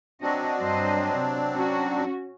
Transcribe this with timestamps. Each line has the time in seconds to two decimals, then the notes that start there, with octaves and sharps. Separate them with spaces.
0.22 F#3 C4 D4 F#4 D#5
0.59 G2 C5 D#5
1.17 C3
1.53 C#4 F#4